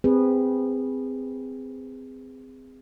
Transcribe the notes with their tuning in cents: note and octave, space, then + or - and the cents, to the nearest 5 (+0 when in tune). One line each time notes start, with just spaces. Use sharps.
C4 -20 G#4 -25 B4 -5